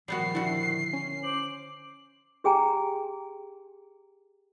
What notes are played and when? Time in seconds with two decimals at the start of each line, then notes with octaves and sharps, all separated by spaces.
0.08 A#2 D#3 F3 G3 B3 F#4 C7
0.35 D3 E4 F#4
0.93 C#4
1.23 C5 D6 F#7
2.44 G4 G#4 G5 G#5 A#5